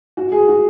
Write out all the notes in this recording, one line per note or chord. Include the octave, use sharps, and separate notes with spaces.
F#4
G#4
F#4